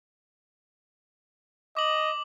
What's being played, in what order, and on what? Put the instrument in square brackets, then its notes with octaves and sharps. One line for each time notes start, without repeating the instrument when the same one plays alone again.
[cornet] D#5 [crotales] D6 F#7